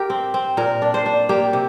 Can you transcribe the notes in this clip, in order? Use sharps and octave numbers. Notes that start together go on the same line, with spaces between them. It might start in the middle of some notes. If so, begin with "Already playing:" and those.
Already playing: G4 A#4
C4
C4
A#2 A#4
D4
C5
D4
A#3 G4
C3